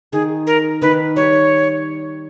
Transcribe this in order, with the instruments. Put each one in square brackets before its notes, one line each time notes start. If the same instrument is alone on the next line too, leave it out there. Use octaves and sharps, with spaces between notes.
[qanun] D#3 [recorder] G#4
[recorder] A#4
[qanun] D#3 [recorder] B4
[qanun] G3 [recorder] C#5